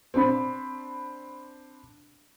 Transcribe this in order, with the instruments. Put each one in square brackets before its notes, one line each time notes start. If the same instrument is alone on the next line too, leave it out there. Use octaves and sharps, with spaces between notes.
[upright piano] C4 D4 B5